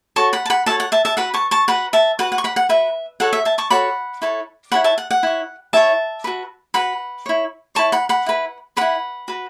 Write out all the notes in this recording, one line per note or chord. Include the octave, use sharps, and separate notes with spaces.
F#4 A4 C#5 A5 C#6
F#5 B5
A5
F#5 B5
F#4 A4 C#5 E5 A5
F#5
E5 A5
E5 A5
F#4 B4 F#5 B5
A5 C#6
A5 C#6
F#4 B4 F#5 B5
E5 A5
F#4 B4 F#5
F#5
C#6
F#5 B5
F#5
F#4 B4 E5
F#4 A4 C#5 F#5
E5
E5 A5
A5 C#6
F#4 A4 C#5 F#5 B5
E4 A4 C#5
E4 A4 C#5 F#5 B5
E5 A5
F#5
F#5
E4 C#5
E4 C#5 E5 A5
F#4 B4
F#4 B4 F#5 B5
E4 C#5
E4 C#5 A5 C#6
F#5 B5
F#5 B5
E4 B4
E4 B4 F#5 B5
F#4 B4